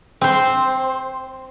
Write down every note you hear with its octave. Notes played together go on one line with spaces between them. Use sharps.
C4 C5